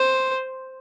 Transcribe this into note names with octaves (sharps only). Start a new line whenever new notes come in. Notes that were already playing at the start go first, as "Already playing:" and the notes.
Already playing: C5